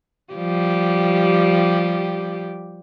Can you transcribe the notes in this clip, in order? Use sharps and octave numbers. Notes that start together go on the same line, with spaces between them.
F3 G3 G4